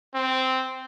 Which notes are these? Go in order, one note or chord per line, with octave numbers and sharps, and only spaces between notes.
C4